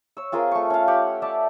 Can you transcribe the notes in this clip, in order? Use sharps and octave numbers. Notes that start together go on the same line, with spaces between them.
C#5 E6
C4 F4 G#4 A#4
A3 C#6
C#4 F5
G4 F#5
D5 E5 A5